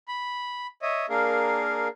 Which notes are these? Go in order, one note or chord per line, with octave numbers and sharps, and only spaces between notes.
B5
C#5 D#5 E5
A#3 D4 G#4 A#4 F5